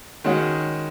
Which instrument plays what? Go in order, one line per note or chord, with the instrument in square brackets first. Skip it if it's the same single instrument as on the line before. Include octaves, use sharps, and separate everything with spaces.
[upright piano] D#3 G#3 C#4 F#4